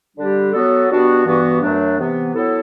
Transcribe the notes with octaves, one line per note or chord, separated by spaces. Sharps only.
D3 G3 D4 G4
F#3 B3 F#4 A4
B2 G3 B3 D4 F#4
G2 E3 B3 F#4
F#2 F#3 A3 D4
C3 E3 B3
F#3 B3 E4 A4